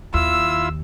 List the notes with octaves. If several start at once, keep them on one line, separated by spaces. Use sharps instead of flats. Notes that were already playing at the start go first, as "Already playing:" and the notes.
D#2 E4 F4 E6